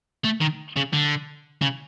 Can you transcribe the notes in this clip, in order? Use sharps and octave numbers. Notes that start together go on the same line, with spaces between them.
A3
D#3
C#3
D3
C#3